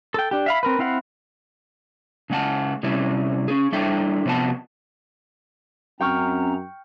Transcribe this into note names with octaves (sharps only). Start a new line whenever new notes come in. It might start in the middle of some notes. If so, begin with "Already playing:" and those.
A4 G5
D4 G4
E5 F5 B5
C4 A#4 B4
C4 E4 F5 F#5
C#3 G#3 F#5 A5
C3 G3 C#4 E4
C#4 G#4
G3 D4 E4 A4 E5 G5
C3 F3 B3 A4 F#5 A5
F#2 C4 C#4 G5 A#5 C#6 F6